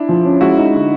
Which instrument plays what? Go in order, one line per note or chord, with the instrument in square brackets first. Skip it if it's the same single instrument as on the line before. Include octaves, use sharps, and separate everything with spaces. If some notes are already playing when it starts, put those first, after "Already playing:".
Already playing: [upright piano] D4 E4
[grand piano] F3
C#4
[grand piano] G#3 [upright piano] E4 F#4
[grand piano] D#4
D3